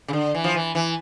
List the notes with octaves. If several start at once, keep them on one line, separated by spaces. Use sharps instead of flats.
C#3
D3
E3
F3
E3
E3